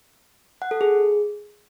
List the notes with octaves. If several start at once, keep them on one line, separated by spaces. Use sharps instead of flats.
F#5
A4
G#4